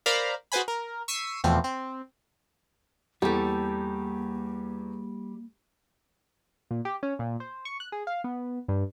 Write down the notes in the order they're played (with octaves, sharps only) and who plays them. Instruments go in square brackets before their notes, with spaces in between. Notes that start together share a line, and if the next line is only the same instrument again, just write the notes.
[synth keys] A#4 C5 D5 F5 A#5 B5
F#4 G#4 B4 C5 G#5 B5
A#4
C#6 E6 B6 C7 D#7
E2 B2 E3 F3 A3 C4
C4
[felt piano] E2 [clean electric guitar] G3 [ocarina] A#3 [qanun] G4 A4
[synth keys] A#2
G4
C#4
A#2
C5
C#6
F#6
G#4
F5
B3
G2